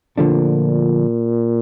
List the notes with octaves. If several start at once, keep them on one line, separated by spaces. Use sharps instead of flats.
A#2 D3 F3 A3 D4